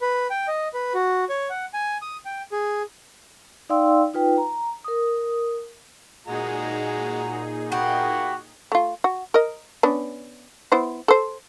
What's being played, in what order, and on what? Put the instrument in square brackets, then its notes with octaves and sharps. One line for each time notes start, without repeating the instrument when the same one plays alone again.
[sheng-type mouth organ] B4
G5
D#5
B4
F#4
C#5
F#5
G#5
D#6
G5
G#4
[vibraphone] D#4 D5 F5 G5 C6 E6
D#4 F4 B4 G5
A#5
A#4 D#6
[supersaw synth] A#2 D#4 G#4 [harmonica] G#3 F#4 A#5
[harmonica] A#3 F#5 B5 [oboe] F#4 [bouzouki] G4
[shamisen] A3 F4
F#4
A#4 D#5
B3 C#4 D4
B3 E4 C5
A4 C5